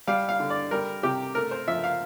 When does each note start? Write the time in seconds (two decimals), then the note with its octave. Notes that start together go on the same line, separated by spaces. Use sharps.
0.07 G3 F5
0.29 F5
0.40 D3
0.50 D5
0.71 G3 A#4
1.03 C3 G4
1.35 A3 A#4
1.51 C5
1.68 F3 E5
1.84 F5